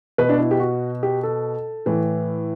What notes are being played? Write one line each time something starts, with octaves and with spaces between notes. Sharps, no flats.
B2 B4
D4
E4
G4
F#4
G4
A4
A2 E3